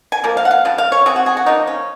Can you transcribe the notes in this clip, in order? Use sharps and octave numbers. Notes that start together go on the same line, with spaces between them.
G#5
F3 A#3
F5
F#5
F5
C#3 F3
F5
C#5
C#3 F#3 C4 G#4
F#4
G#4
F#4
F3 A#3 C#4 D#4
C#4